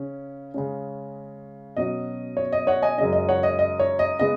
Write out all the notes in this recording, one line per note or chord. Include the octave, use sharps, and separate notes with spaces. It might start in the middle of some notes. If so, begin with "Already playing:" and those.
Already playing: C#3 C#4
C#3 G#3 C#4
B2 F#3 C#4 D#5
C#5
D#5
C#5 F#5
D#5 G#5
F#2 C#3 G#3 C#4 D#5
D#5
C#5 F#5
D#5
D#5
C#5
D#5
C#3 G#3 B3 D#5